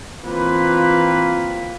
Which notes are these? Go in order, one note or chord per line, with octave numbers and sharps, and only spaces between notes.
E3 A#3 C4 F4 B4